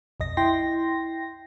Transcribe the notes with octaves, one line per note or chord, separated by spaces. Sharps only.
B1 F2 D#5 A#6
E4 G5 C6 A#6